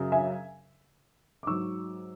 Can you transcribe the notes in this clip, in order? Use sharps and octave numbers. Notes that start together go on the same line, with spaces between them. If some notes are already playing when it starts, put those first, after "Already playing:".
Already playing: F#2 C#3 F#3
E5 G#5
D6
G#2 F#3 C#6 E6